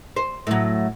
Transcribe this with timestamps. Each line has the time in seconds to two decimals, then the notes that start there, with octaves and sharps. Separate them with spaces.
0.16 C5
0.47 A2 F#3